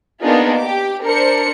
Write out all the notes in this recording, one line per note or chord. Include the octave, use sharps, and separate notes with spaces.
A#3 B3 D4 D#4 F4 G#4
G4 D6
D4 A#4 C5 C#7